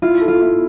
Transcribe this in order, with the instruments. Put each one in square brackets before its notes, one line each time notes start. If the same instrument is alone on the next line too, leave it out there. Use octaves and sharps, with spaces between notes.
[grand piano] E4 [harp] F4
[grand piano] A4
[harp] F4
[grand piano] E4